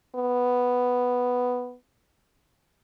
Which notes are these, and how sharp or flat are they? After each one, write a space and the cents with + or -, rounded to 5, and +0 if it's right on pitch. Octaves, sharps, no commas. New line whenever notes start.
B3 +0